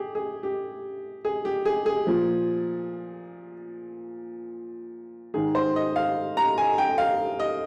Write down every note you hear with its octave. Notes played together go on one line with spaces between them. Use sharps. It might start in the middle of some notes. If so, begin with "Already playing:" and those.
Already playing: G4 G#4
G#4
G4
G#4
G4
G#4
G#4
A#2 F3
G#2 D#3 G#4
C5
D#5
F5
A#5
G#5
G5
F5
D#5